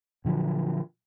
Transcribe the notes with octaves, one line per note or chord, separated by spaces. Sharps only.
A#2 D3 F3 F#3